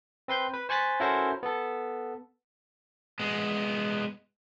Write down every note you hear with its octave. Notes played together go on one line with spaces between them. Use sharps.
C4 B4 C6 G6
B4
C5 G#5 C#6 F#6 A6 B6
C#4 E4 F#4 A4 A#4 C5
B3 A4
G#3 B3